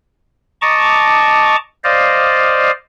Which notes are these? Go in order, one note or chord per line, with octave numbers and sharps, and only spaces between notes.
D#5 A5 A#5 C#6 D6
C5 D5 D#5 F5